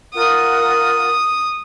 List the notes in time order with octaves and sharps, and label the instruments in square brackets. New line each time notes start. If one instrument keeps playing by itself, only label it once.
[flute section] F4 A#4 F#5 [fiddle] D#6